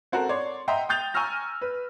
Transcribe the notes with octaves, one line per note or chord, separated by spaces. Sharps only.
C4 F#4 A4 A#4
C#5 D5 C6
D#5 E5 F#5 G5 A#5 C6
G5 D#6 G6 A6 F7
G#5 A#5 C#6 E6 F6 A#6
B4